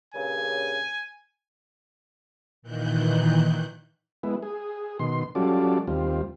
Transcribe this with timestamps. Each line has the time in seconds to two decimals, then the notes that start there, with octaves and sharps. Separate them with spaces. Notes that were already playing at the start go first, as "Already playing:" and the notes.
0.15 G2 A#2 C#3 G#5
2.62 A#2 D#3 E3 F#6 G6
4.23 G#3 B3 E4
4.42 G#4
4.99 B2 D#3 C6
5.35 F#3 G3 C#4 F4 A4 D5
5.87 D#2 G3 C4 F4